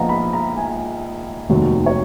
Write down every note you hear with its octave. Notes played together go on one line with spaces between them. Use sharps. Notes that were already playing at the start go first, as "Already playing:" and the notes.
Already playing: A#1 A#2 F3 B3 D#4 F5 F#5 A#5
B5
A#5
G#5
F1 D#2 D#3 F#3
C#5